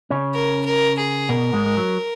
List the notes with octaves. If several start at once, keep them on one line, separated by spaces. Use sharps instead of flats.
C#3 C#4
A#4
A#4
G#4
B2 B3 A#4
G#2 G#3
G#3
F#3